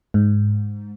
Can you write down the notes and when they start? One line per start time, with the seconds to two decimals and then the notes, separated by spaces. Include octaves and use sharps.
0.14 G#2